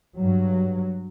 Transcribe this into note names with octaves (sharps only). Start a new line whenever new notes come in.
G2 F#3